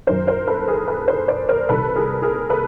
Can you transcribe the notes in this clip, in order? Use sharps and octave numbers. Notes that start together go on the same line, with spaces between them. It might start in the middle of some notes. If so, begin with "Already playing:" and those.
F#2 D#3 F#3 A#4 C5
A#4 C5
A4 B4
G#4 A#4
A4 B4
A#4 C5
C5 D5
A#4 C5
C2 C3 D#3 A4 B4
G#4 A#4
G#4 A#4
A4 B4